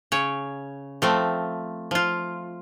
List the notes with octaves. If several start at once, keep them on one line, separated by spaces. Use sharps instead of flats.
C#3 C#5
F3 A3 C4
F3 F4